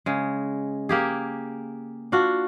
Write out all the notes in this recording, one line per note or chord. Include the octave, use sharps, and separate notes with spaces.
C#3 G#3
A#3 G4 G#4
D4 F4 F#4